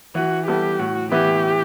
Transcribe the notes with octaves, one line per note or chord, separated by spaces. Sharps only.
E3 F#4
G3 B3 E4 G4 A4
A2 F#4
E3 B3 E4 G4